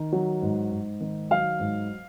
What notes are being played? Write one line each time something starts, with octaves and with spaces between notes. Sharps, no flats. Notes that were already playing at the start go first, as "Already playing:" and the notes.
Already playing: D#3
F#3
G#2
G#2
D#3
F#3 F5
G#2